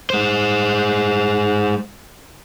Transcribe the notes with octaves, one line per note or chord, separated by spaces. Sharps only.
G#3 C5